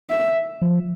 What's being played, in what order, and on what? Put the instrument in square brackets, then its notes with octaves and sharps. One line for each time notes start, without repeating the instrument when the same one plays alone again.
[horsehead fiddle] E5
[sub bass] F3